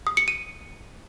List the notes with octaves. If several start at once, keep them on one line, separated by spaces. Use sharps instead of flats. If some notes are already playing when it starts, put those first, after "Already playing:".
D#6
C#7
D#7